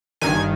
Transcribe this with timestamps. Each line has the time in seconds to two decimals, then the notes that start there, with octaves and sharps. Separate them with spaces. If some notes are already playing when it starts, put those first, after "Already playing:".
0.21 G1 G2 D#3 G#5